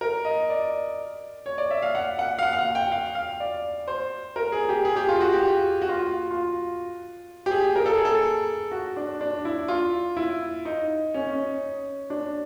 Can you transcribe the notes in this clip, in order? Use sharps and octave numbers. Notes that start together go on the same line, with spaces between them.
A#4
D#5
D5
C#5
D5
E5
F5
F#5
F#5
F5
F#5
F5
F#5
G5
F5
F5
D5
C5
A#4
G#4
G4
G#4
G4
F4
F#4
G4
F#4
F4
F#4
F4
G4
G#4
A#4
A4
G#4
A4
F#4
D4
D4
E4
F4
E4
D#4
C#4
C#4
D4